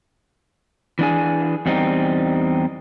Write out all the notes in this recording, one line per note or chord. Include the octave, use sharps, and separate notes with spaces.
E3 D4 G#4
E2 G3 C4 D#4